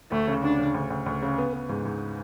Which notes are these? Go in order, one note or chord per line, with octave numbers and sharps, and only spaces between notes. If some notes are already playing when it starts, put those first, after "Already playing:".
D2 A3
C#3
D2 D4
C#3
D2
D2
D2
C#3
B3
B3
G#2
G#2